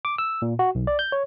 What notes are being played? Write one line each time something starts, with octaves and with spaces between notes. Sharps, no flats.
D6
E6
A#2
F#4
B1
D5
G6
C#5